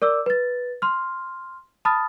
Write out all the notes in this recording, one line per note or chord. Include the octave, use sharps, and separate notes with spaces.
A#4 D5 D6 E6
B4 A6
C6 F6
A5 B5 D#6 F6 A6